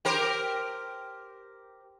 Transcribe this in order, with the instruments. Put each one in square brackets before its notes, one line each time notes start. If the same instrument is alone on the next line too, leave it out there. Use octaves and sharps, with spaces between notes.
[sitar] G4 A#4 C5